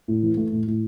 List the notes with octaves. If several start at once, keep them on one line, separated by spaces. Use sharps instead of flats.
A2
E3
A3
A2
A2